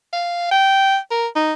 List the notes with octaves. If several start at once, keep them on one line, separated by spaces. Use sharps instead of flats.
F5
G5
A#4
D#4